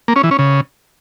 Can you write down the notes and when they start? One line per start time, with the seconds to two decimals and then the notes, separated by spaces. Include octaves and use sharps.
0.08 A#3
0.16 C#4
0.23 E3
0.31 C#4
0.39 C#3